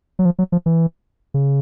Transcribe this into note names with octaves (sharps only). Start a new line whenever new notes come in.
F#3
F3
F#3
F3
E3
C#3